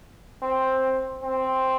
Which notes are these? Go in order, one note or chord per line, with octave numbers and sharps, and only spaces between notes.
C4
C4